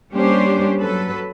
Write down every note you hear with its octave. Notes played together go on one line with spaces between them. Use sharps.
G3 A#3 C#4 D4 G4 C5
F#3 A4 B4